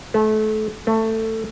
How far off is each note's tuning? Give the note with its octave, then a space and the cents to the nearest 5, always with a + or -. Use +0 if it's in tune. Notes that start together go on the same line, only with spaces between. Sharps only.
A3 -30
A3 +15